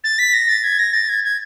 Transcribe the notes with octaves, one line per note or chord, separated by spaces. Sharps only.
A6
B6
A#6
A6
G#6
A#6
A6
G#6
G#6